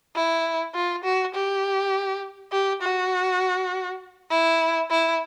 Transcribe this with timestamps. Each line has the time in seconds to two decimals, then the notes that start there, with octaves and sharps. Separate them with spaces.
0.16 E4
0.75 F4
1.04 F#4
1.34 G4
2.52 G4
2.82 F#4
4.31 E4
4.91 E4